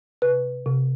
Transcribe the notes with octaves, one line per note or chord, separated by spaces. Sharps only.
C3 B4
C3